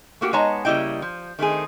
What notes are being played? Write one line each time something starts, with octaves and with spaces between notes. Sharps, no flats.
A3 A#3 F#4 G4
G#3 B3 D#4 C#5 A5 A#5
C#3 G3 A#3 E4 D#5 G5
F3
D#3 A3 C4 G#4